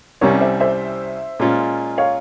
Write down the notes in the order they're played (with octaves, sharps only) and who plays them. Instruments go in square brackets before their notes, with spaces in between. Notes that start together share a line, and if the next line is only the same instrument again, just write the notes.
[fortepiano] C2 C3 G3 C#4 [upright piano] A#4 C#5
[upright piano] C5 E5
C5 E5
[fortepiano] A#2 G#3 C#4 F4
[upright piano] C#5 F5